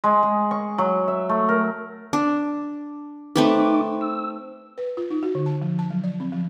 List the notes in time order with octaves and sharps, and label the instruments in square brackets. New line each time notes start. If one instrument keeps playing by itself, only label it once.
[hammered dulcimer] G#3
G#4
C#6
F#3
E5
A3
A#4
[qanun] D4
[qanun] A3 C4 B4 [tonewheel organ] D#4 D6
[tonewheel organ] E6
[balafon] B4
F4
D#4
F#4
D3
A5
F3
A5
F#3
D5
C4
F3